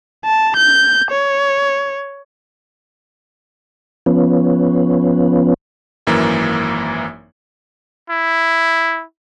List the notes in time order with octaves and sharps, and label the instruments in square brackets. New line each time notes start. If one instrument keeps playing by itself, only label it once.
[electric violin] A5
G6
C#5
[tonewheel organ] F3 B3 C#4
[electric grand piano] G#1 F#2 E3 A#3
[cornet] E4